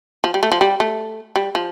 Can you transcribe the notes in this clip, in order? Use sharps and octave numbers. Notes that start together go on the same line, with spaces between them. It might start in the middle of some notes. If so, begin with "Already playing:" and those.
F3
G3
A3
F3
G3
A3
G3
F3